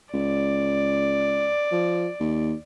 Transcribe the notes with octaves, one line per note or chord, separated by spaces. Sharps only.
C#2 D5
F3
D#2